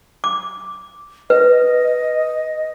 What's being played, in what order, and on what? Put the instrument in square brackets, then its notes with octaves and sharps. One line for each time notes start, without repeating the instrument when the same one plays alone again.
[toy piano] D6
[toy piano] B4 [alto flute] D#5